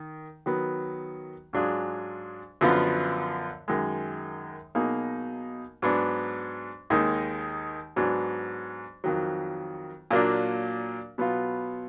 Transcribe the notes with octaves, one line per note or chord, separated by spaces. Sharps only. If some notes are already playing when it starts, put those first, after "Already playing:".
Already playing: D#3
D#3 F#3 B3
G#2 F#3 D4 F4 G#4
F#2 D3 F3 B3 F4
F#2 D#3 G#3
B2 F#3 A#3 D#4 G#4
G#2 F#3 B3 D4
D#2 D#3 G#3 D#4
G#2 F#3 B3 D4 F#4
F2 D#3 F#3
A#2 F#3 A#3 D4
B2 F#3 B3 F4